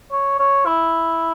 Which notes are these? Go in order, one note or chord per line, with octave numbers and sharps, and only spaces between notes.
C#5
C#5
E4